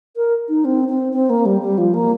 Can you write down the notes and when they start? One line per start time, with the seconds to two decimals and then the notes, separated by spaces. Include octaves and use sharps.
0.16 A#4
0.49 D#4
0.65 C4
0.89 C4
1.13 C4
1.30 A#3
1.45 G3
1.62 G3
1.78 F3
1.94 A#3